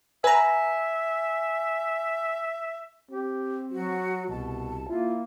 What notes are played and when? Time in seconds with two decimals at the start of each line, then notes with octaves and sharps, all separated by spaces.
0.24 B4 E5 G#5 A#5
3.11 C4 G4
3.71 F#3 F#4
4.30 C2 B2 A5
4.89 A#3 E4 F4